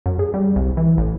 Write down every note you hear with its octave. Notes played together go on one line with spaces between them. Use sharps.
F#2
G#4
G3
C2
E3
A1